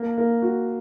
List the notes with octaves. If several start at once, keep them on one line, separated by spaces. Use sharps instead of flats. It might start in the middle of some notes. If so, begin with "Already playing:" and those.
Already playing: A#3
A#3
F#4